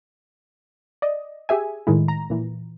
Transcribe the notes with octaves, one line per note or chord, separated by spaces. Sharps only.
D5 D#5
G4 G#4 E5 G#5
A2 D#3 G#3 E4
A#5
A#2 E3